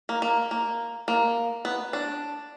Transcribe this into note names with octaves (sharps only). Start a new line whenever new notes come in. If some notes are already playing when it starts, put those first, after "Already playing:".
A#3
A#3
A#3
A#3
B3
D4